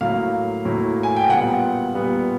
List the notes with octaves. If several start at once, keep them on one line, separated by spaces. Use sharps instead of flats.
A2 F#3 A#3 F5
A2 F#3 A#3
G#5
G5
A#2 G3 B3 F#5
A#2 G3 B3